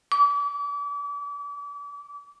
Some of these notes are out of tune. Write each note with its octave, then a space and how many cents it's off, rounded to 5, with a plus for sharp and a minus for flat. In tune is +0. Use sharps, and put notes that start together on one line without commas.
D6 -35